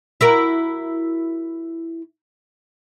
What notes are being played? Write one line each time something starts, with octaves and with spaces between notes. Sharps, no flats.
E4 F#4 A#4